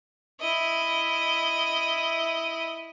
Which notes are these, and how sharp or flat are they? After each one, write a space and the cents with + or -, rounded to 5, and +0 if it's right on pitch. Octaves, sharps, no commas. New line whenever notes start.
E4 +0 D#5 +0